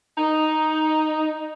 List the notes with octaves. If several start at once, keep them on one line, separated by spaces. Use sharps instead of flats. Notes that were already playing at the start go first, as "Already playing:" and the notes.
D#4